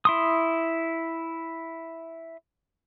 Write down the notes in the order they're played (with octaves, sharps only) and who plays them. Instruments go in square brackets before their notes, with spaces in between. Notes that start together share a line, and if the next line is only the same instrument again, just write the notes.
[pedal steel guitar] E4 C6 D#6